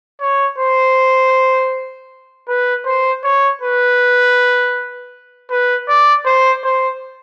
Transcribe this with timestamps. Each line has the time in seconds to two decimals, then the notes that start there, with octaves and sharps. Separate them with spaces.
0.21 C#5
0.58 C5
2.48 B4
2.86 C5
3.24 C#5
3.62 B4
5.50 B4
5.88 D5
6.26 C5
6.64 C5